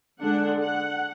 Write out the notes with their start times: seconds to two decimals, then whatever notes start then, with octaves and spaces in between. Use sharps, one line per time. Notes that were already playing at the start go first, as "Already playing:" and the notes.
0.21 D3 G#3 D4 F#5
0.61 F#5